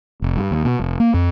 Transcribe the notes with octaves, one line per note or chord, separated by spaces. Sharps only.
F1
G2
D#2
B2
F1
A#3
F2